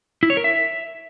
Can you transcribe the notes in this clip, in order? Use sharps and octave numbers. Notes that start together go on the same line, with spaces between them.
E4
C#5
A#4
E5